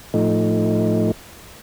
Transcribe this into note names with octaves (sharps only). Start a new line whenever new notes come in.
A2 F3 A3 D#4